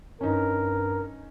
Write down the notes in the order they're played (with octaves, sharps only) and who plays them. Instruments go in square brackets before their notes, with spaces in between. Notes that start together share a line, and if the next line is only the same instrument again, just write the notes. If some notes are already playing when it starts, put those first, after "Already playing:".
[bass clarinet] G2 [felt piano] C#4 D#4 [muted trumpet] A#4